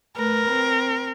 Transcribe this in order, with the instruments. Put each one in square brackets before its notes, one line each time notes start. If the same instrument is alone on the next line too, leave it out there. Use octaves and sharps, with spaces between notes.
[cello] A3 B4 [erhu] A#4
[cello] C4